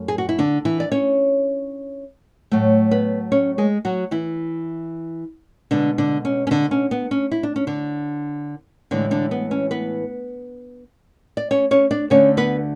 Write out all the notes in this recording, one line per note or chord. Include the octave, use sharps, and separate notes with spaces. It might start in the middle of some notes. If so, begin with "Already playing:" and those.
Already playing: F#2 A3
G#4
F#4
E4
D3 D4
E3 E4
D5
C#4 C#5
A2 F#3 A3
B3 B4
C#4 C#5
G#3 G#4
F#3 F#4
E3 E4
B2 D3 G#3 D4
D3 D4
C#4
C#4
D3 D4
C#4
B3
C#4
E4
D4
C#4
D3 D4
A2 D3 E3 G#3 D4
D3 D4
B3
C#4
B3 B4
D5
C#4 C#5
C#4 C#5
D4 D5
D2 D3 A3 C#4 C#5
B3 B4